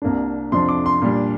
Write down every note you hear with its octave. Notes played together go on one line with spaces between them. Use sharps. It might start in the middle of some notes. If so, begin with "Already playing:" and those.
C2 C3 A#3 D4
F2 C3 F3 D4 C6
D6
C6
A#2 G3 D4